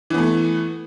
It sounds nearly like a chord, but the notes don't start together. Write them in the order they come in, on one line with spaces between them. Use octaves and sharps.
E3 B3 A3